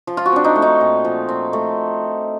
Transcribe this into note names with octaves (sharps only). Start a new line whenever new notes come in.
F3
F4
F#4
C4 D4
D#4
A3
D#4
A#2
F3
C4
A3